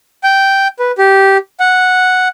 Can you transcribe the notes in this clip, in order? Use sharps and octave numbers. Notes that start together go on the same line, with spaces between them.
G5
B4
G4
F#5